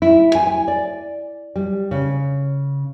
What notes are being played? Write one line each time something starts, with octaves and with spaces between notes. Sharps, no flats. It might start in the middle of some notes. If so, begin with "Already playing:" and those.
E4
G#5
G#5
D5
G3
C#3